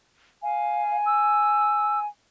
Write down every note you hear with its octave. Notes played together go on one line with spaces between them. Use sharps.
F5 G#5
E6